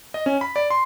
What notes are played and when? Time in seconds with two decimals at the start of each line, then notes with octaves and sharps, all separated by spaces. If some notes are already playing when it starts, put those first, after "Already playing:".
0.14 D#5
0.26 C#4
0.41 B5
0.56 D5
0.70 C6